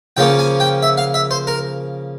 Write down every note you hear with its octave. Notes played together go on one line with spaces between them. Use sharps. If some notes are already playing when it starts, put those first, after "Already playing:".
C#3 F3 A#3 C#4 G5
G#5
G5
E5
F5
E5
C5
A#4